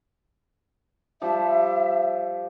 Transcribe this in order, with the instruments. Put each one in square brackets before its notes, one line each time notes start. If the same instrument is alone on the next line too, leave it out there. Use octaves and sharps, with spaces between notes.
[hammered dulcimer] F3 G3 [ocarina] E5